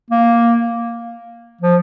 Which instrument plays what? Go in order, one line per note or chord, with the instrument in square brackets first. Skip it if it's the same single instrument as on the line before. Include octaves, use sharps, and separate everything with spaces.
[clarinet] A#3
F3